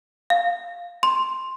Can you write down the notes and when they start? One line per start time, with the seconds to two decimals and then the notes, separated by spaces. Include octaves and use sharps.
0.30 F5
1.03 C6